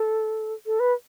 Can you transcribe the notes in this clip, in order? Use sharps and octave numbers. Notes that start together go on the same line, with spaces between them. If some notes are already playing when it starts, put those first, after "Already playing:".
Already playing: A4
A4
B4